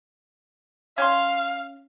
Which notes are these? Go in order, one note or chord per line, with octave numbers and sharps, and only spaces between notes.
C#4 F5 G5 C6